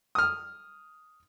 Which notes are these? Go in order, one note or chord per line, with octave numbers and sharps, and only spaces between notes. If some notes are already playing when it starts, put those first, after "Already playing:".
D#6 F6